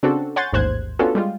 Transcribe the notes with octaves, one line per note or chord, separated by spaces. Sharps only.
C#3 C4 D4 F#4 A4
C#5 F#5 G#5 C6 G6 A6
A1 D#2 G#2 C5 F#6 G#6
B3 C#4 D4 F4 F#4 A4
G3 G#3 F4